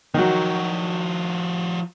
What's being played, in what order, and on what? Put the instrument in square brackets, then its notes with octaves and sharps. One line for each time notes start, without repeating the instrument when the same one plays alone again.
[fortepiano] D#3 F#3 [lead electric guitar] F3 F#4